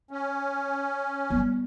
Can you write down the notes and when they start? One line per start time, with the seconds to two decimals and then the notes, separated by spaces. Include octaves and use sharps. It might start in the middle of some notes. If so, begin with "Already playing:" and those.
0.11 C#4
1.30 G3 B3